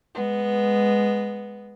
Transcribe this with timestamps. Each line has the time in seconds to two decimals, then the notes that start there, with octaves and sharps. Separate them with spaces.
0.14 G#3 B3